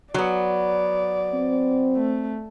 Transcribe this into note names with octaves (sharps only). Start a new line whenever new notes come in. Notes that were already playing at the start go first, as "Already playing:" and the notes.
F#3 B3 D5
C4
A3